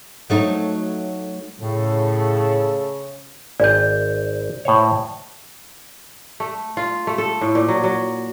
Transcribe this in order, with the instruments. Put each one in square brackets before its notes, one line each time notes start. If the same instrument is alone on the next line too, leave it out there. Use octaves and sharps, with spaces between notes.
[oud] F#3 A3 D#4
[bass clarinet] A2 [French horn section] C#3 [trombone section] A3 A4
[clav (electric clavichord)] G#1 [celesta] D5 G6
[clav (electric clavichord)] A2 C5 C#5
[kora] A3
F4
A3
A4
A2
A#2
F#3
F#3